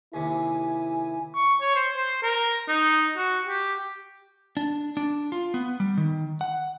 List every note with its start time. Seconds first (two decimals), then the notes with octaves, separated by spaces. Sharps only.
0.14 D#2 C3 E4 G#5
1.35 C#6
1.61 C#5
1.75 C5
1.97 C5
2.23 A#4
2.68 D#4
3.17 F#4
3.46 G4
4.57 D4
4.97 D4
5.32 F4
5.54 B3
5.80 G3
5.97 D#3
6.41 F#5